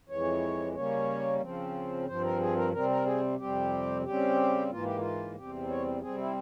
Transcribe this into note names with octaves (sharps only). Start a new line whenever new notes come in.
F2 E3 G#3 C#5
C#3 G3 A#3 C#4 C#5
C#3 F3 C4
G2 F3 C4 C5
A#4
G#4
A#4
C3 G3 C4 A#4
A#4
G#4
F2 C3 G3 C4 G4
C#3 G3 C4 G4
G#2 E3 A#3 F4
G4
F4
E2 C3 G3 C4 G4
C#5
C3 G3 C4 G#4
E4